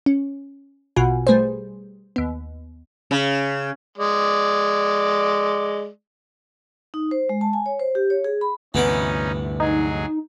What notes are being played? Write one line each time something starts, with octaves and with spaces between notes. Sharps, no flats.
C#4
A#1 B2 F4 F#4 F#5 G#5
G3 A3 G#4 B4 C5
D#2 B3
C#3
G#3 D5
D#4
C5
G#3
A5
G#5
C#5
C5
G4
C#5
G#4
B5
D2 G2 C3 E3 B3 C#4 D#4 D6
F#3 D#4 G#4